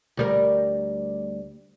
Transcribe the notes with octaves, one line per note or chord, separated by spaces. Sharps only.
D2 G3 A#4